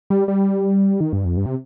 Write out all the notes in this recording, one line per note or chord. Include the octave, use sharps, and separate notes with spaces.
G3
G3
D#3
G2
F2
G2
C3